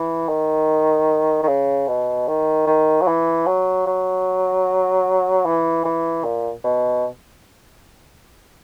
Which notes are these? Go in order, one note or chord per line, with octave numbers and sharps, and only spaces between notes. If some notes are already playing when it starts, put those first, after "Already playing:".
Already playing: E3
D#3
D#3
C#3
B2
D#3
D#3
F#3
E3
F#3
F#3
E3
E3
A#2
B2